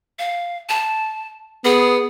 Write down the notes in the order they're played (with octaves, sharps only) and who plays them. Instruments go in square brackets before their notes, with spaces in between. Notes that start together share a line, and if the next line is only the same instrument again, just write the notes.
[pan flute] F5
A5
[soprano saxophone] B3 [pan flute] G#4